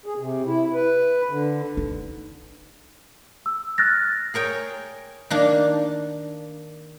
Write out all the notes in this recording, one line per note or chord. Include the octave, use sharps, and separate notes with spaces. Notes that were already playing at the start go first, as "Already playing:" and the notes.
G#4
C3
E4
B4
D3
D#4
E6
F6 F#6 A6 A#6
G#4 A#4 C#5 G5
D#3 A#3 D4